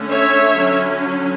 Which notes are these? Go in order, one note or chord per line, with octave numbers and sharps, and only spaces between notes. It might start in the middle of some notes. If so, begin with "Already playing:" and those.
Already playing: D3 A3 C#4
C#5 E5
D3 F#3 C#4